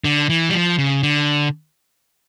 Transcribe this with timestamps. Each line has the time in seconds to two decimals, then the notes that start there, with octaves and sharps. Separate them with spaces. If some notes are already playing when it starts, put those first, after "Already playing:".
0.04 D3
0.29 E3
0.49 G3
0.53 F3
0.78 C#3
1.03 D3